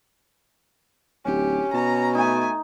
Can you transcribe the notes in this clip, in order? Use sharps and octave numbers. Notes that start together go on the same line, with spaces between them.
D1 C#4 G4
B2 A#5
A3 D#4 G#5